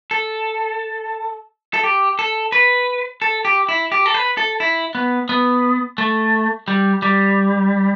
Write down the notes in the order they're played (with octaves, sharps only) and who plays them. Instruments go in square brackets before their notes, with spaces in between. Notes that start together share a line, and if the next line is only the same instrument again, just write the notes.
[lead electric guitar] A4
A4
G4
A4
B4
A4
G4
E4
G4
A4
B4
A4
E4
B3
B3
A3
G3
G3